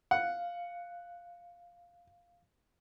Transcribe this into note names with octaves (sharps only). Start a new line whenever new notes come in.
F5 F#5